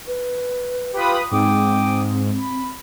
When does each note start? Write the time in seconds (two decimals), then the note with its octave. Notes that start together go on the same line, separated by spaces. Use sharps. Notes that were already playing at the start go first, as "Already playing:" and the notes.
0.07 B4
0.93 F4 G4 B4 B5 D#6
1.31 G#2 C4 G5 D6 D#6
2.38 B5